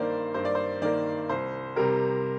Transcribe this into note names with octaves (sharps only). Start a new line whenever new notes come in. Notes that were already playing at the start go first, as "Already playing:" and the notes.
Already playing: G2 D#3 A#3 C5 D5
G2 C5
D5
C5
D#3 A#3 D5
C2 C5
C3 G3 A#4